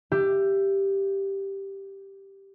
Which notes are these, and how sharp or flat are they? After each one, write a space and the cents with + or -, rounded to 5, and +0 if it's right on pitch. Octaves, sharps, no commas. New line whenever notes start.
G4 +0 E5 +25